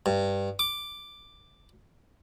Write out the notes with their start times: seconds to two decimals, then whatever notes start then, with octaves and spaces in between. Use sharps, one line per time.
0.06 G2
0.59 D6